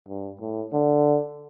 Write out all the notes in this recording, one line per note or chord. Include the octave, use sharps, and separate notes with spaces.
G2
A2
D3